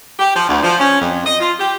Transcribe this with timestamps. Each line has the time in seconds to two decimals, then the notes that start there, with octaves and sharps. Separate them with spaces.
0.18 G4
0.35 F3
0.49 D2
0.63 F3
0.79 C#4
1.01 F2
1.26 D#5
1.40 F4
1.59 G4